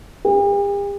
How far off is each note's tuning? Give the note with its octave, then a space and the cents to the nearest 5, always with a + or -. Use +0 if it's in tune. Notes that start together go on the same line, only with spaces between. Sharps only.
G4 +45